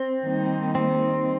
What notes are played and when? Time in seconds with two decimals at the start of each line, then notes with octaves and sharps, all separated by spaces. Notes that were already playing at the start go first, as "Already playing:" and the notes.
Already playing: C4
0.24 D#3 G3 A#3 D#4
0.75 C4